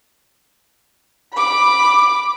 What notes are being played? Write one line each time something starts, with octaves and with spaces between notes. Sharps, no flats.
B5 D6